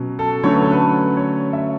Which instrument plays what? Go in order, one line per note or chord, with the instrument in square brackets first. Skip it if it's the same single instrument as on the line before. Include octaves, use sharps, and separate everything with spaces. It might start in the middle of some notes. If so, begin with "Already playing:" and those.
Already playing: [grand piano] B2 F#3 C#4
A4
D3 F#3 A3 C#4 C#5
B4
A4
B4
C#5
E5